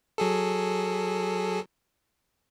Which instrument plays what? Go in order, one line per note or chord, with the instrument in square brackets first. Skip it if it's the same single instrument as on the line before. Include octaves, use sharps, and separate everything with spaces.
[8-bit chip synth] F#3 G#4 A4